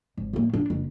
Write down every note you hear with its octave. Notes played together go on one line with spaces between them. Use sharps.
G#1
A2 A#3
D4
F#1